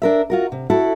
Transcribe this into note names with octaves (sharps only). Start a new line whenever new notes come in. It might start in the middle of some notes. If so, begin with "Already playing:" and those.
D4 A#4 E5
F4 F#4 A#4
C3
E4 F#4 A4